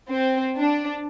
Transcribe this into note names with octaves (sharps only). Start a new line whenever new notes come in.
C4
D4